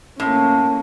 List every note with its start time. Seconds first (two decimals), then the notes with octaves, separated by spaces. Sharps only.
0.20 A2 A#3 C#4